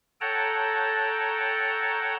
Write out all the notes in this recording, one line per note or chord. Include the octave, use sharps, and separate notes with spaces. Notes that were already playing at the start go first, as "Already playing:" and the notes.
A4 C#5 F#5 G5 A5 A#5